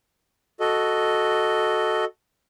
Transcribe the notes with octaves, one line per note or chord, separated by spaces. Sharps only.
F#4 A4 D#5